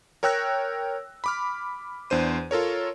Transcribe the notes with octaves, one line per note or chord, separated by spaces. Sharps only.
A#4 C#5 G5 E6 F#6 A#6
B5 D6 F6
E2 D4 C5 D#7
F4 A4 A#4 C#5